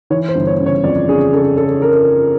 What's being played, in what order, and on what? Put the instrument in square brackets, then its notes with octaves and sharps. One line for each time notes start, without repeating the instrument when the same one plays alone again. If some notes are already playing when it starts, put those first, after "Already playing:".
[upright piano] E3 C#5
C5
G1
C#5
C#3
C#5
F2 D5
C#3 G#4
C#3 A4
C#3 A4
A#4